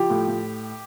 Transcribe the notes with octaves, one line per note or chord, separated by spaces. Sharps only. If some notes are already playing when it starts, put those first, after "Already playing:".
Already playing: F3 G4
A2
A2